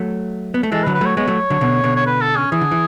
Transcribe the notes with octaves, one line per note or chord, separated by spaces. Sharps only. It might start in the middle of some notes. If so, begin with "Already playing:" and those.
Already playing: F#3 A3
B3
A3
E3 G#3 A4
B4
D3 F#3
B4
F#3 A3 C#5
G#3 B3 C#5
F#3 A3
D3 F#3
B2 D3
B2 D3
C#5
B4
A4
C#4
E3 G#4
D3
E3